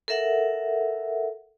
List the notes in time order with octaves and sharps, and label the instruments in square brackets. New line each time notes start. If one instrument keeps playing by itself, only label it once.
[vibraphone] A4 A#4 E5 F#5